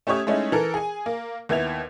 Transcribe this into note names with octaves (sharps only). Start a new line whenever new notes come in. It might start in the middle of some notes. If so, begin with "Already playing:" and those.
A3 C#4 G4 C#5 D#6 G#6
G#3 A3 C#4 D#4 E4
E3 A4 A#4
G#4 G#5
A#3
D#2 B3 E4 G#6 F7